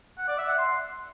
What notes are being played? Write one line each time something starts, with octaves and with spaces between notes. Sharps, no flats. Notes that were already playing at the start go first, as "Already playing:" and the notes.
F#5
D5
E5
F#5
C6